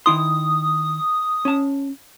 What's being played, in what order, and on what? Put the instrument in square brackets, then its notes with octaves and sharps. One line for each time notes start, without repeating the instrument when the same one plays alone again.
[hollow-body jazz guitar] D#3 E4 C6 [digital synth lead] D#6
[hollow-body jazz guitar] C#4 A5